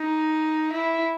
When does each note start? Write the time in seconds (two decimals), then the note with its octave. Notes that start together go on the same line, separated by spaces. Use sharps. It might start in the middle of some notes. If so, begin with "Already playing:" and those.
Already playing: D#4
0.72 E4